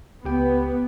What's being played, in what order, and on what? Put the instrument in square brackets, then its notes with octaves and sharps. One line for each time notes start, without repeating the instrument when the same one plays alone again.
[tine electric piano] C#2 G4 G5 [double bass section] B3